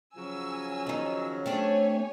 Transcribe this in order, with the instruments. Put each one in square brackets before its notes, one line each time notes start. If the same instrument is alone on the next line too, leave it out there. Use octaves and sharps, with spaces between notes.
[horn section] C#3 F3 F#3 [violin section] G#5 E6
[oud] D#3 D#4
[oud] A3 C4 D4 [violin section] G4 C#5 G#5